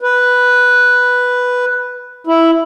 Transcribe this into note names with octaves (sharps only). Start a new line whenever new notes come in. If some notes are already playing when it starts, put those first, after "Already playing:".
B4
E4